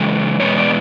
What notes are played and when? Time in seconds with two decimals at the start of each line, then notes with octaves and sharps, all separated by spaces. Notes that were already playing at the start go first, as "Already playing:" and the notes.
Already playing: C#3 E3 G#3 A4
0.40 E2 B2 G#3 B3 C#5
0.58 D5